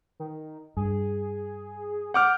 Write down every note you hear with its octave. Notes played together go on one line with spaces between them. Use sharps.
D#3
G2 G#4
F#5 D6 F6 G6